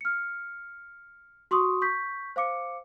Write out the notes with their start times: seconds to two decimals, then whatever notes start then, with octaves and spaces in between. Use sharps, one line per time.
0.01 F6 C#7
1.51 F#4 C6 C#6 D#6
1.82 C#6 G6 B6
2.36 C5 F5 D6 C#7